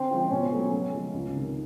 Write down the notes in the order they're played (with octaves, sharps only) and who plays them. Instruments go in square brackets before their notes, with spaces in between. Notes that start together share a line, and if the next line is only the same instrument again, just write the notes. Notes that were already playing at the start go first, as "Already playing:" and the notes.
Already playing: [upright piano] D3 [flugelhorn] C4
[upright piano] F3 G#3 C#4 F4
[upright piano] B2 [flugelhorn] C#4
[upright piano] F#3 A3
C#3
F3 G#3
C#2
C3 D#3